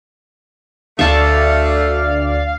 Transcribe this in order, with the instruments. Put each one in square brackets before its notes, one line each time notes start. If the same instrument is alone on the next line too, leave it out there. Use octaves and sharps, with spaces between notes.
[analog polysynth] D2 D5 [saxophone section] A3 [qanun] E5 A5 [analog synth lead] F5